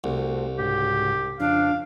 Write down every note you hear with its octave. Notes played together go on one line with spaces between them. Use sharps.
C2 A3 C4 F#4
G#2 C#3 F#4 G4
F2 C#3 F3 D4 F5